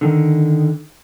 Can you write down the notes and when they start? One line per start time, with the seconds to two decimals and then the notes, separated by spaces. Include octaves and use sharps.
0.01 D3 D#3